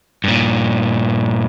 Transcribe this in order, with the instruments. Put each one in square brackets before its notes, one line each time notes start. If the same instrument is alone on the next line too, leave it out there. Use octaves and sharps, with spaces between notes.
[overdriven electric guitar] G2 A#2